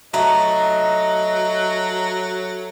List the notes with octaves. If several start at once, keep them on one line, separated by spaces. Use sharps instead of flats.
F#3 A3 D#5 A#5